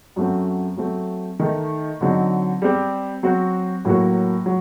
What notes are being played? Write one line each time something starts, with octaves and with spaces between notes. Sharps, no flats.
F#2 F#3 A3 C4
F#3 A3 C4
D#3 A3 D#4
D3 F#3 C4 D#4
G3 C4 G4
F#3 C4 F#4
A2 F#3 A#3 F#4
F#3